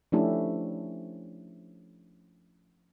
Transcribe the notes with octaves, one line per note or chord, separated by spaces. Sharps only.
F3 A3 C#4 D4 E4 G4